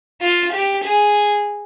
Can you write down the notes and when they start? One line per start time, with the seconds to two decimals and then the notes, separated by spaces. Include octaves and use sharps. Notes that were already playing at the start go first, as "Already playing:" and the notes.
0.21 F4
0.53 G4
0.84 G#4